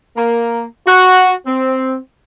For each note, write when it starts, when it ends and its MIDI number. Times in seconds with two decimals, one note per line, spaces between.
0.17 0.64 58
0.87 1.31 66
1.47 1.97 60